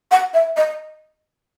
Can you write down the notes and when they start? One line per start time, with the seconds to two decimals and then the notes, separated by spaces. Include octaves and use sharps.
0.11 F#5
0.34 E5
0.57 D#5